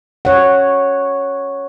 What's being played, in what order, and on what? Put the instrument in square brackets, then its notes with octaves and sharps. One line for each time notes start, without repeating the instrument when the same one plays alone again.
[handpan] C#5 F#5